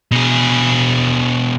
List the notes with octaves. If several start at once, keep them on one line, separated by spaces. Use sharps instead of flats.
B2 G#4